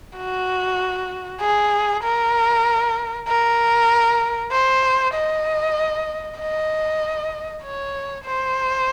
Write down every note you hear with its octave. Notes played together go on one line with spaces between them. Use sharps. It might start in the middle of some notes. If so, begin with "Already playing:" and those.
F#4
G#4
A#4
A#4
C5
D#5
D#5
C#5
C5